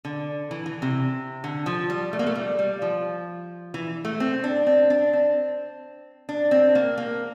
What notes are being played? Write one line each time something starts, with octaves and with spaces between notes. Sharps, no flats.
D3
E3
E3
C3
D3
F3
G3
A3
A#3
A3
G3
G3
F3
E3
A3
C4
D4
C4
D4
C4
D4
C4
A#3
A#3